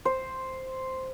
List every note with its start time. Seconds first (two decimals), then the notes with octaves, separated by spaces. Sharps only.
0.05 C5